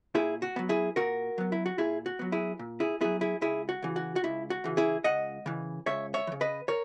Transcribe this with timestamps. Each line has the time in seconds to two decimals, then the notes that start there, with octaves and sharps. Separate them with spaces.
0.14 A#2 E4 G#4
0.42 F#4
0.56 F#3 B3
0.69 E4 G#4
0.96 A#2 F#4 A#4
1.38 F#3 B3
1.52 E4
1.66 F#4
1.78 A#2 E4 G#4
2.06 F#4
2.19 F#3 B3
2.32 E4 G#4
2.59 A#2
2.80 E4 G#4
3.01 F#3 B3 E4 G#4
3.21 E4 G#4
3.41 C#2 E4 G#4
3.69 F#4
3.82 C#3 E3
3.96 F#4
4.16 F#4
4.24 C#2 E4
4.50 F#4
4.64 C#3 E3
4.77 E4 G#4
5.04 C#2 D#5 F#5
5.46 C#3 E3
5.86 C#2 C#5 E5
6.14 C#5 E5
6.27 E3
6.32 C#3
6.41 B4 D#5
6.68 A#4 C#5